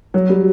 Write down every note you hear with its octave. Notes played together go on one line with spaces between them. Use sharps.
F#3
G3